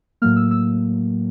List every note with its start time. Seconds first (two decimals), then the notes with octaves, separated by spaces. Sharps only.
0.22 A2 F#3 A#3 F6
0.36 E6
0.51 E6